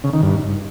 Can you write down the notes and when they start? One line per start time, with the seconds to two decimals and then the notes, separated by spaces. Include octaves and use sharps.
0.04 C#3
0.13 D#3
0.23 G2